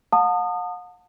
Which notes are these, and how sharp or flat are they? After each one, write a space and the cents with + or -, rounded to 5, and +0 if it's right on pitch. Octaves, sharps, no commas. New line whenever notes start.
F#5 -45 A5 +30 D#6 -25